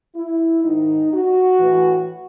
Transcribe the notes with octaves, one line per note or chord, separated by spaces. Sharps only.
E4
G#2 D#3 D#4
F#4
A2 E3